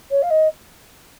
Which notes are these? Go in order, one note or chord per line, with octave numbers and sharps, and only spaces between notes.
C#5
F5
D#5